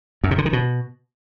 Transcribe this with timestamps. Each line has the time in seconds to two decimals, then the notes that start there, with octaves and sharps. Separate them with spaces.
0.24 F#2
0.31 C3
0.38 D3
0.46 D#3
0.53 B2